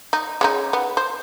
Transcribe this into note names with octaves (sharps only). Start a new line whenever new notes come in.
D#4
G#3 C#4 D#4
B3
C5